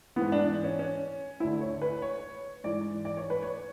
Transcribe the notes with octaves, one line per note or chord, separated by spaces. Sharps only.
G#2 E3 B3
D4
C#4
C#4
D2 D3 E4
C#5
B4
C#5
G#2 E3 D5
D5
C#5
B4
C#5